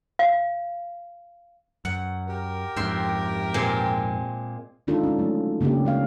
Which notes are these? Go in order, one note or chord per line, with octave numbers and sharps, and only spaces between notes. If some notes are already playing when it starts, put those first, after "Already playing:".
F5
F#2 F#5
G4 A#4
F2 G#2 E5 G5 C6
A#2 G#3 C4
D#3 G#3 D4 D#4 F4 A4
G#3 C#4
F#3 A3
C#3 A#3 C#4 D4 G4
G#3 C#4 F5